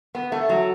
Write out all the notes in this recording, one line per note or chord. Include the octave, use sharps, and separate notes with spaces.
B3
A3
F#3